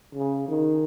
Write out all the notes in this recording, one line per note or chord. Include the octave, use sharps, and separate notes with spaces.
C#3
D#3